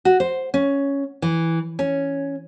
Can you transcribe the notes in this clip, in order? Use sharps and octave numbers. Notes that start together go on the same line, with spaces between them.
F#4
C5
C#4
E3
C#4